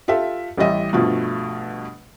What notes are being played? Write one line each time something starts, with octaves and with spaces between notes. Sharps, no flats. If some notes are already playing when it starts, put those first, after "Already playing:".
F4 G4 A4 E5
A1 E3 G3 D#5 E5
G2 B2 F3 A3